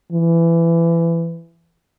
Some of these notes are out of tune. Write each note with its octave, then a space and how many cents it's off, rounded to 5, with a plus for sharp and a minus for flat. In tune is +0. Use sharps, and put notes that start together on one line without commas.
E3 +20